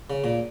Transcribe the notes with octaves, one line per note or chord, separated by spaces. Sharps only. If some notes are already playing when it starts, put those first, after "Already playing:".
C#3
A#2